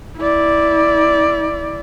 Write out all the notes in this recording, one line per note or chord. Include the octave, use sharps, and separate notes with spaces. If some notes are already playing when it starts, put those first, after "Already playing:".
E4 D5